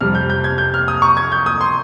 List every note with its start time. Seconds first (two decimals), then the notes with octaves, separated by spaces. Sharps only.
0.01 F2 C3 G3 F6
0.15 G6
0.30 G6
0.44 G#6
0.58 G6
0.74 F6
0.88 D#6
1.02 C#6
1.17 G#6
1.32 G6
1.46 D#6
1.61 C6